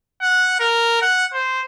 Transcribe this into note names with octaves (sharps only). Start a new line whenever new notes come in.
F#5
A#4
F#5
C5